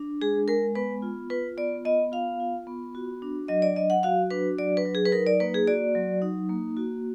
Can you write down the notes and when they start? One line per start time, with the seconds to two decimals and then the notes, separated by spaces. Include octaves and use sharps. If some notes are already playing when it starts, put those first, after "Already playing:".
Already playing: D4
0.22 G#3 G#4
0.48 G#3 A#4
0.75 B3 B4
1.02 F4
1.30 F4 B4
1.58 B3 D5
1.85 B3 D#5
2.12 F4 F5
2.40 F4
2.67 B3
2.95 F#4
3.22 D4
3.48 F#3 D#5
3.62 D5
3.76 F#3 D#5
3.90 F#5
4.03 F#4 F5
4.31 D4 B4
4.58 F#3 D5
4.77 B4
4.85 F#3
4.95 G#4
5.06 B4
5.12 D#4 A#4
5.27 D5
5.40 A#3 B4
5.54 G#4
5.67 F#4 D5
5.95 F#3
6.22 D#4
6.49 A#3
6.77 F#4